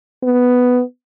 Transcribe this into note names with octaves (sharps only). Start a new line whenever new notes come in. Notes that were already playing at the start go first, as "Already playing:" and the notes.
B3